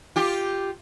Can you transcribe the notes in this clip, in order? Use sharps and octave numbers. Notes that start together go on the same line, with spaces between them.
F4 G4